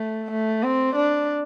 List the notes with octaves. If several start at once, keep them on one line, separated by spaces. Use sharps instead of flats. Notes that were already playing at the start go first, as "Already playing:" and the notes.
Already playing: A3
A3
C4
D4